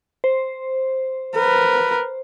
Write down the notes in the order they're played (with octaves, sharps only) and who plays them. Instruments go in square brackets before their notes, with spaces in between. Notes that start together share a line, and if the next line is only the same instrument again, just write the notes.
[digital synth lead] C5
[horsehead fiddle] A#4 B4